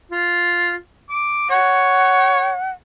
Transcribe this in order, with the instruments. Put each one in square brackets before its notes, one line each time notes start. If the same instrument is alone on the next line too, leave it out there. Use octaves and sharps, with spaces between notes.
[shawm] F4
D6
[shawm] C#5 [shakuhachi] F#5